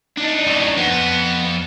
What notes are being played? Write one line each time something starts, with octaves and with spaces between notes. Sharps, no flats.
D4 D#4
A2 F#3
F2 B3